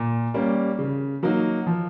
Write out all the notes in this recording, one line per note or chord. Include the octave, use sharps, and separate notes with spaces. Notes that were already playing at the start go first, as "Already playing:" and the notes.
Already playing: A#2
G3 A#3 C#4
C#3
F#3 A#3 D#4 F#4
F3